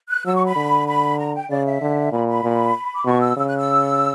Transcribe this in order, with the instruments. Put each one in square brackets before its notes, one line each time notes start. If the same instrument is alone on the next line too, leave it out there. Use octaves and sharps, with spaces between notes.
[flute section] F#6
[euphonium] F#3 [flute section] E6
[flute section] C#6
B5
[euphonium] D3
[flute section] B5
A#5
G5
[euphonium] C#3 [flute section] D5
[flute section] E5
[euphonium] D3
[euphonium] A#2 [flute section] B5
[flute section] B5
[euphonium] A#2
[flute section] D6
[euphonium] B2 [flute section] C#6
[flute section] E6
[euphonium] C#3 [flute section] E6
[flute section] F#6
E6